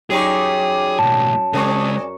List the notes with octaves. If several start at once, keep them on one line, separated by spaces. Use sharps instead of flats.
F#2 G3 D#4 G4 G#4 A#5 C#6
B1 A2 A5
C#3 G#3 C4 D4 G#4 A#4 C#6